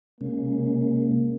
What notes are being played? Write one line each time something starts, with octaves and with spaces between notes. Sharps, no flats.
C3 G#3 A#3 C#4